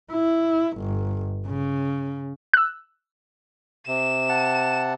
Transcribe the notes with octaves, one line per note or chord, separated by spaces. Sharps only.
E4
G1
C#3
E6 F#6
C3 E7
F#5 A5